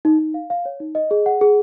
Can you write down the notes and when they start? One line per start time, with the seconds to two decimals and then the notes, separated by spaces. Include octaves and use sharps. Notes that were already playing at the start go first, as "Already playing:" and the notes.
0.05 D#4
0.19 D#4
0.34 F5
0.50 F5
0.65 C#5
0.80 D#4
0.95 D#5
1.11 G#4
1.26 F#5
1.41 G#4